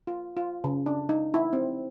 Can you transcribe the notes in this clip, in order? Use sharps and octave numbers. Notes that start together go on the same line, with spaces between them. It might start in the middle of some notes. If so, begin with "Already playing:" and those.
F4
F4
C#3
D4
D#4
E4
C4